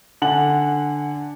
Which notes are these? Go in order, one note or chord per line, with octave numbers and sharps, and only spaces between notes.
D3 F#5 G#5 F#7